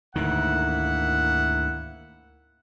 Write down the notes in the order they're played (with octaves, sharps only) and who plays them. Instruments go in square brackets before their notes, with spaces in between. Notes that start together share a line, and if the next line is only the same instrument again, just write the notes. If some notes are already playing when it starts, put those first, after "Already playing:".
[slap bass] D2 G#2 D#3 [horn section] A#3 E4 F#5